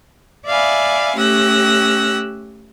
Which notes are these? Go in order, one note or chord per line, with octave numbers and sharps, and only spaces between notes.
D5 E5 F5 G#5 B5
A3 C#4 G4 E6 F#6 A#6